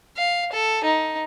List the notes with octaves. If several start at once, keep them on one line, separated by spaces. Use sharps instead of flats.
F5
A4
D#4